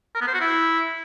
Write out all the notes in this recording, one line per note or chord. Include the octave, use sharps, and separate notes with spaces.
A#4
B3
C5
F#4
E4